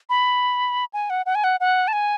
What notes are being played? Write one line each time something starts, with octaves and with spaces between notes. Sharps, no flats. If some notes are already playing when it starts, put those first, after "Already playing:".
B5
G#5
F#5
F#5
G#5
F#5
F#5
A5
G#5